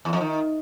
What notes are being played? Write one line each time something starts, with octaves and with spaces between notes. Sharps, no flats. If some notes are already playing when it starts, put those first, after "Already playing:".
E2
F2
D#3